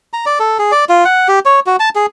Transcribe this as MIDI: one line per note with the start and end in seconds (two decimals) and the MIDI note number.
0.13 0.25 82
0.26 0.39 74
0.40 0.58 69
0.59 0.72 68
0.72 0.85 74
0.89 1.04 65
1.05 1.28 78
1.28 1.39 67
1.45 1.60 73
1.67 1.76 66
1.80 1.89 81
1.95 2.06 68